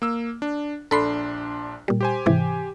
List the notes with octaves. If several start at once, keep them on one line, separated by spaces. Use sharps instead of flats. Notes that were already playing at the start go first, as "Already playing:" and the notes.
A#3 E6
D4
A#1 D4 A4 B5 C6 C7
A#2 G3
G4 C5 G#5
G#2 C3 E3